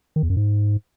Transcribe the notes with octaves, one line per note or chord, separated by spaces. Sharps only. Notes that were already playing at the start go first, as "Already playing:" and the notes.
D#3
E2
F#2
G#2